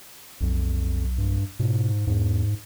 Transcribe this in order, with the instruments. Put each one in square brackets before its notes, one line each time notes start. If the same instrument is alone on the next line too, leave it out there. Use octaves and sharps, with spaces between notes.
[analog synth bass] B1 [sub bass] F2
[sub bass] G2
[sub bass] G#2 [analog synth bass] B2
[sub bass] E2 [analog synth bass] G#2